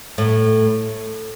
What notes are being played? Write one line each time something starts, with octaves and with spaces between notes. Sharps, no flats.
A2